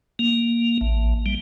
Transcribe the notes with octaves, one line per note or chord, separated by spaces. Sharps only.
A#3
A1
G3